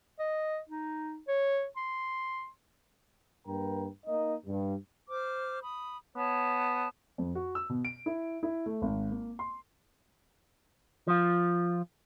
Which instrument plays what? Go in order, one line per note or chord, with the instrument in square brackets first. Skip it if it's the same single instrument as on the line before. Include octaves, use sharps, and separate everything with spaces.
[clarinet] D#5
D#4
C#5
C6
[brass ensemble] G2 A#3 A#4 B4 G5 A#5
A#3 D#4 D#5
G2
[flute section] C5 D6 F6
B5 D#6
[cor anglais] B3 [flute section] C#5 A5
[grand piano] F2
F#4
E6
B2
D7
E4
E4
A3
G#1
A#3
C6
[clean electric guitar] F3 F4